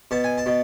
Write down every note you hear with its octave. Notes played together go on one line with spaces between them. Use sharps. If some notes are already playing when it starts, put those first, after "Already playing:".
B2 A5
G#5
A5
B2